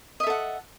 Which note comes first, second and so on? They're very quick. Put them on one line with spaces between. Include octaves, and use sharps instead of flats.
D#5 E5 A4 F#5